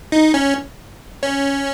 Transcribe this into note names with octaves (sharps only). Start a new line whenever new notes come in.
D#4
C#4
C#4